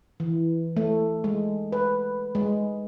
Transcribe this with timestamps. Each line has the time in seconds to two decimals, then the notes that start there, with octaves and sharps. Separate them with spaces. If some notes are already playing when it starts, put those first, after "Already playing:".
0.20 E3
0.76 A3
1.24 G#3
1.72 B4
2.35 G#3